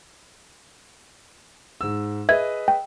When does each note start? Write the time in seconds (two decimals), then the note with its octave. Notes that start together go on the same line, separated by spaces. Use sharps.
1.81 G#2 E6
2.29 G#4 B4 D#5 E5 G#6
2.68 G5